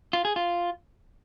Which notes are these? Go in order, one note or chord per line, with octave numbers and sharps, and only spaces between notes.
F4
G#4
F4